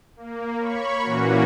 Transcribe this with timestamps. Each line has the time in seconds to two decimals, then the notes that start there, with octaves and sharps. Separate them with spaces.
0.16 A#3
0.60 C#5 B5 C#6
1.02 A#2 E3 A#3 C#4 F#4